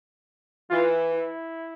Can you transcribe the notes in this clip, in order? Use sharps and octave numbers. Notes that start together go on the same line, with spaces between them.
E3 F4
E4